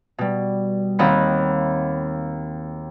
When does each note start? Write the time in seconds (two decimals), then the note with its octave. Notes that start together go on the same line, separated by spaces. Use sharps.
0.18 B2 G3
0.99 D#2 C4 D#5 F#5 B5